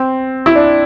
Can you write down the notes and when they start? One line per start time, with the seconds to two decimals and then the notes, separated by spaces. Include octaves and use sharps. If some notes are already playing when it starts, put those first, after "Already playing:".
Already playing: C4
0.46 E4
0.56 D4